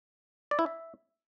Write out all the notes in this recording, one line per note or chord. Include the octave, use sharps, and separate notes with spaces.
D5
E4
E5